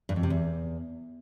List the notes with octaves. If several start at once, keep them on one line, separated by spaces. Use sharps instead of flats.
G2
F2
C3
E2